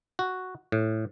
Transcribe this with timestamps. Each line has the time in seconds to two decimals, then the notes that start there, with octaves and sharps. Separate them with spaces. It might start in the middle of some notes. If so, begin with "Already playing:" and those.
0.19 F#4
0.72 A2